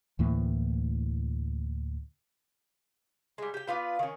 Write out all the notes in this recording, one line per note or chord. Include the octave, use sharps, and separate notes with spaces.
D2 A2 E3 A#3
G3 G#3
G4 G5
B3 F4 B4 D5
D#3 C#4